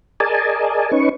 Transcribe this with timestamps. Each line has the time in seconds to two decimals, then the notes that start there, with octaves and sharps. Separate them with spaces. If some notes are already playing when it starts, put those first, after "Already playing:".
0.20 G#4 A#4 D5 D#5 G#5 A5
0.92 C#4 D#4 B4 C#6